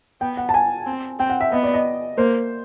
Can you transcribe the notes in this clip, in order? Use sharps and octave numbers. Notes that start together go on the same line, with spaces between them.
B3 G5
F#5
A5
G#5
C4
C4 G5
F#5
E5
B3 D#5
D5
D#5
A#3 C5